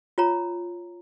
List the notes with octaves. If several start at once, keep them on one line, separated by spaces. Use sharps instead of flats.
F4 C#5 A#5